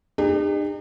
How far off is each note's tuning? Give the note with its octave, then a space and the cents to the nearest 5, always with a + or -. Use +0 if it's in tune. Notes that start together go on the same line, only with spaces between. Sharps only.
D#4 -45 G4 +45